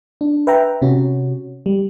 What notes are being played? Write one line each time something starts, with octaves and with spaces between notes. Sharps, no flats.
D4
B4 E5 G5 A#5
C3 C#4 F#4
G3